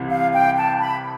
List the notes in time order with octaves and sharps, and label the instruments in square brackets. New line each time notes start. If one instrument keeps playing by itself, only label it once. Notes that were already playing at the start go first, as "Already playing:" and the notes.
Already playing: [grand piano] C2 C3 E3
[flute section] F5
G5
A5
B5